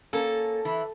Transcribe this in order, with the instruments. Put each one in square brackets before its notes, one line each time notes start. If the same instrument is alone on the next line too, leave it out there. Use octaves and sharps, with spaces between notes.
[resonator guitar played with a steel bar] A#3 C#4 [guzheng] A4
[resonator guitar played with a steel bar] E3 E4